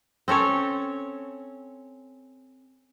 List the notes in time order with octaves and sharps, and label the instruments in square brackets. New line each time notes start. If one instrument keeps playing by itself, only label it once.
[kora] C4 C#4 A4 C#5